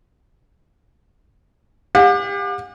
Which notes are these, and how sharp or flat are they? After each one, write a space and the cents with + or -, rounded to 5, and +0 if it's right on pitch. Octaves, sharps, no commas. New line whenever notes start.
G4 +30 F#5 -45